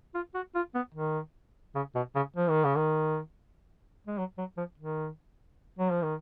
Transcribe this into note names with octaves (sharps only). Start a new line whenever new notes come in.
F4
F#4
F4
B3
D#3
C#3
B2
C#3
F3
D#3
C#3
D#3
G#3
F#3
F#3
F3
D#3
F#3
F3
D#3